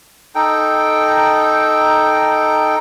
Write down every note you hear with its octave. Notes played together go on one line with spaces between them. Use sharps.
D#4 A4 G5